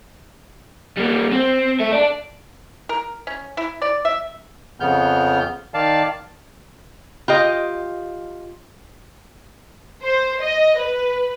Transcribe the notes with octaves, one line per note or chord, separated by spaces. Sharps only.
G3 A#3
C4
A4 E5
D5 A5
A#4
C#4
E4
D5
E5
F2 C#3 B3 F6 G6
D#3 D5 F5 A5
F4 G4 D#5
C5
D#5
B4